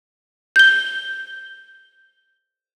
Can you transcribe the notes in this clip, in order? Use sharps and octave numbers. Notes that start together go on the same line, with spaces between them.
G6 G7